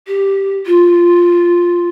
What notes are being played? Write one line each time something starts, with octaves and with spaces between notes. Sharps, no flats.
G4
F4